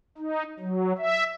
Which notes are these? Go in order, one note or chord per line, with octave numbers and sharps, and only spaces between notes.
D#4
F#3
E5